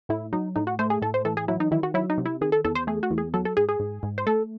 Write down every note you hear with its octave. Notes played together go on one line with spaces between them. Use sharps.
A2 E4
F#3 D#4
A2 D#4
F#4
A3 C5
G#4
A2 A4
C5
E3 A4
G#4
F#3 E4
D#4
D#3 E4
F#4
F#3 E4
D#4
C3
E4
D#3 G#4
A4
E2 A4
C5
A3 G#4
F#4
E2
G#4
F#3 A4
A4
G#2 G#4
G#4
G#2
G#2
C5
A3 A4